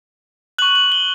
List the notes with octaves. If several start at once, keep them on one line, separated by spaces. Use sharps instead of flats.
C#6 F#6 F#7
F#7
G7